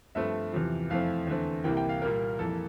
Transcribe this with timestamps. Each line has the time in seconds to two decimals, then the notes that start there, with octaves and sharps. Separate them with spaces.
0.15 G2 F3 A3 C4 E5
0.53 E2 C3 F3
0.90 F2 E3 A3 C4 F5
1.27 E2 D3 A3 C4
1.64 C2 C3 E3 A#3 G5
1.77 G5
1.89 F5
2.02 A#2 G3 A#3 A#4
2.39 F2 E3 A#3 A4